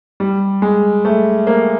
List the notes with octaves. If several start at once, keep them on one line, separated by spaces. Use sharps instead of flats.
G3
G#3
A3
A#3